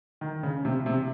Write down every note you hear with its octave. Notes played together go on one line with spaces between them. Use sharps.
D#3
C#3
C3
C3